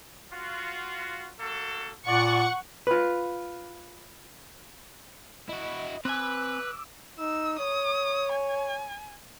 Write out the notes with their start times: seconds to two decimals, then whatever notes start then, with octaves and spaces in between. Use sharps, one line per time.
0.32 F4 F#4
1.40 A#3 F#4 A4
2.06 A#2 D5 F#5 C#6
2.87 F4 B4
5.49 E4 F#4 D#5
6.05 C4 B4 G#5 D6 E6 F#6
7.19 D#4 E6
7.59 C#5 D#6
8.33 G#5